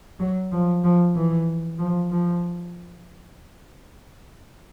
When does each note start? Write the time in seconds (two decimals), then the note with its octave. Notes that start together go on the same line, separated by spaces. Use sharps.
0.20 F#3
0.52 F3
0.84 F3
1.16 E3
1.79 F3
2.11 F3